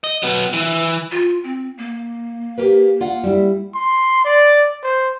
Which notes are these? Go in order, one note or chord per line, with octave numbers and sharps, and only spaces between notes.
D#5
F#3 B3
E3 E4
F4
C4
A#3
G4 A#4 B4
F4 F5 F#5
G3 E4
C6
D5
C5